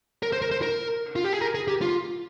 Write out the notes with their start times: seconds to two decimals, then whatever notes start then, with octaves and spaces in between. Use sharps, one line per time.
0.23 A#4
0.32 C5
0.42 A#4
0.51 C5
0.62 A#4
1.16 F4
1.24 G4
1.33 G#4
1.41 A#4
1.55 G#4
1.68 G4
1.81 F4